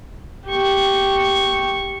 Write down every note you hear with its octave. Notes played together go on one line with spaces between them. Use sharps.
G4 C#6